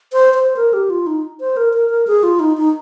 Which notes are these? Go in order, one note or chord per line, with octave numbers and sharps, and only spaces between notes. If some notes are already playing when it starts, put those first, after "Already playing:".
C5
C5
A#4
G4
F4
D#4
C5
A#4
A#4
A#4
G#4
F4
D#4
D#4